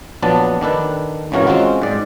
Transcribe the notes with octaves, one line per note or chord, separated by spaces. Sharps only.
A#1 F#3 B3 D4 A5
D#3 D4 A4 B4
G#1 C#3 E3 F#4 A#4 C#5
G#3 C4 C#4 F4 F#4
G#2 D5